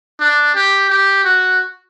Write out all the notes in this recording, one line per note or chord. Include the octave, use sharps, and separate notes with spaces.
D4
G4
G4
F#4